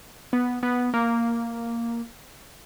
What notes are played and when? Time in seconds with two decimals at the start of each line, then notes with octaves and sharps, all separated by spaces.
0.33 B3
0.63 B3
0.94 A#3